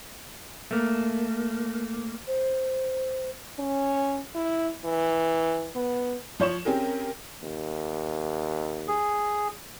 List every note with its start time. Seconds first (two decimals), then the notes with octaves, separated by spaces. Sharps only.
0.71 A3 A#3
2.28 C5
3.59 C#4
4.35 E4
4.85 E3
5.75 B3
6.40 F3 C#5 C#6 E7
6.65 C4 C#4 G4 G#4 A#4
7.43 D#2
8.88 G#4